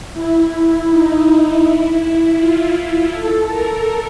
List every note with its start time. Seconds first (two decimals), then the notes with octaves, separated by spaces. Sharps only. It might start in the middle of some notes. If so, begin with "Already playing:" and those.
0.14 E4
0.88 D#4
1.62 E4
2.37 F4
3.11 A4
3.48 A#4